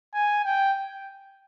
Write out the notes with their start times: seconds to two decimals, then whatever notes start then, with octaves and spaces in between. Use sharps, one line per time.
0.14 G#5
0.44 G5